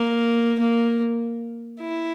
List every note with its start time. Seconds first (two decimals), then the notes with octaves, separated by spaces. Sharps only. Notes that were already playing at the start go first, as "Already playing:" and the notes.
Already playing: A#3
0.60 A#3
1.80 E4